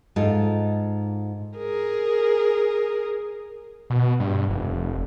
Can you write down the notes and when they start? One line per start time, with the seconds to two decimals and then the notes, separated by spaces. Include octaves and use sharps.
0.16 G#2 F4 A4
1.58 G#4 A#4
3.90 B2
4.20 G2
4.49 F1